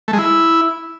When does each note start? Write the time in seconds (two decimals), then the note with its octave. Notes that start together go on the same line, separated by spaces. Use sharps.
0.08 A3
0.13 G#3
0.18 E4